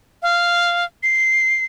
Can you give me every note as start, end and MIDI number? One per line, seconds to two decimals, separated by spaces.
0.22 0.84 77
1.03 1.65 96